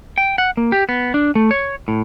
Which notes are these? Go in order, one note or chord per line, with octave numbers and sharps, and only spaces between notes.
G5
F#5
A#3
G4
B3
D4
A3
C#5
A2